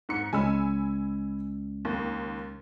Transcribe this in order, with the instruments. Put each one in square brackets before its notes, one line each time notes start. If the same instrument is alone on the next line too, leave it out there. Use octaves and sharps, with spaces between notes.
[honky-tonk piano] G#2 C#7
[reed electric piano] C#2 G#3 C#4 [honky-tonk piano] G#5 B5 E6
[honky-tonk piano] D#2